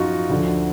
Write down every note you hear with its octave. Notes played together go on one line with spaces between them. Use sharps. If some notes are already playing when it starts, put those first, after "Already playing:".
Already playing: F#2 F3 D#4 F4 F#4
D2 D3 F3